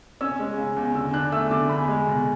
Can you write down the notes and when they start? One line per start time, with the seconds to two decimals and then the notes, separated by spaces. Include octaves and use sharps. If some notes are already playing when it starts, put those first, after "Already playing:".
0.21 C#4 E6
0.39 G#3
0.58 C#3
0.76 E2
0.95 D3 E6
1.13 D4 F#6
1.32 A3 E6
1.51 D3 D6
1.69 E2 B5
1.88 G#3
2.07 B2